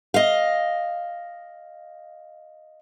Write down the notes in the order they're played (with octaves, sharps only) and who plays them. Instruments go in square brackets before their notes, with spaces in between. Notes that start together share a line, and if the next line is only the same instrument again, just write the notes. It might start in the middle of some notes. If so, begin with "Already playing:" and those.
[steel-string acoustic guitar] D#5 F5